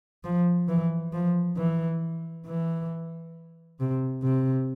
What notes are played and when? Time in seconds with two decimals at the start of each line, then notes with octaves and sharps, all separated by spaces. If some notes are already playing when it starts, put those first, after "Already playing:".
0.24 F3
0.68 E3
1.13 F3
1.56 E3
2.46 E3
3.80 C3
4.23 C3